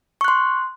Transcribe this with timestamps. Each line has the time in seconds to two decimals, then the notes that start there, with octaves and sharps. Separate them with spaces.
0.21 C#6
0.24 F#6
0.28 C6